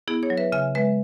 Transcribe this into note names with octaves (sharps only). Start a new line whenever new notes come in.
B3 E4 G#4
G#4 C#5
F#3
B4 E5
C#3 E5 G#5
G#3 B4 E5